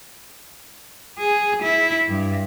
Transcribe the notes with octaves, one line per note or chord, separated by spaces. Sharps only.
G#4
E4
G2